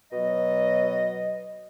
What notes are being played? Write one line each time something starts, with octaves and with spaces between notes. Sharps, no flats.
B2 F#3 D#5